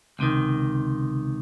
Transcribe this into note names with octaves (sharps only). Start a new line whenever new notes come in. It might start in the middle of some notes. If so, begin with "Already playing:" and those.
C#2 C3 D#3